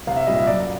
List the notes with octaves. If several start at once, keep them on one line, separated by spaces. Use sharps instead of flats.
C2 F5
E5
A#2 G3 D#5
E5
F#2 D5